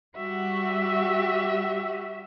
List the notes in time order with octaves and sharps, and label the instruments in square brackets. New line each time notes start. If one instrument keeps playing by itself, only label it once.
[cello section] G3 F#4 G4 [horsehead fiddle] E5